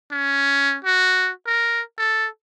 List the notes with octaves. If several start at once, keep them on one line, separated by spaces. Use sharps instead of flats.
C#4
F#4
A#4
A4